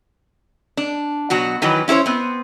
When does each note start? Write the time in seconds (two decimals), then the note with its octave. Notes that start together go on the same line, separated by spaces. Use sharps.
0.77 D4
1.30 B2 F#3 F#4
1.62 D#3 E3 F#3 B4
1.88 C#4 E4 G#4 C5 C#5
2.06 B3 C4